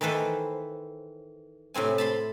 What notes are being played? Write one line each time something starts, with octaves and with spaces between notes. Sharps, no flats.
D#3 E3 A4 B4 C5
A2 C3 C4 G#5
A5 B5 C6